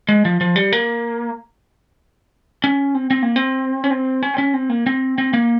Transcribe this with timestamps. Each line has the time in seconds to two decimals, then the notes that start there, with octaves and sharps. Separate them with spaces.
0.09 G#3
0.25 F3
0.41 F3
0.56 G3
0.73 A#3
2.64 C#4
2.95 C4
3.11 C4
3.23 A#3
3.36 C4
3.84 C#4
3.91 C4
4.23 C#4
4.34 C4
4.38 C#4
4.54 C4
4.69 A#3
4.86 C4
5.18 C4
5.33 A#3